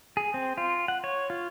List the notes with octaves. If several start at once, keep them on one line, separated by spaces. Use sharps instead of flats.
G#4
C4
F4
F#5
C#5
F4